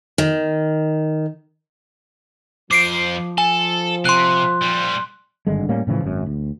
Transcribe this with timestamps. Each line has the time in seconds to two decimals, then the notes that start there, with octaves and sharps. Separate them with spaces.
0.18 D#3
2.71 F2 F3 C5 D6 C7 D7
3.38 A4 G#5
4.05 C3 C6 F#6
4.62 A#2 G3
5.47 G#1 G2 D3 G#3
5.69 A2 G3 A#3 C#4
5.87 A2 C#3 E3 F3
6.04 G#1 F#2
6.26 D2